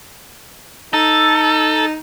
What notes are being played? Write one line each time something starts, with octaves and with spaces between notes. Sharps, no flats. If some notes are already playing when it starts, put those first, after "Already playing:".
D#4 A4